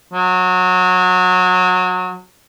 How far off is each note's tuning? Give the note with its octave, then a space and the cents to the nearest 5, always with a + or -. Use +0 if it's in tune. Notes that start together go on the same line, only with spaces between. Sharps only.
F#3 -20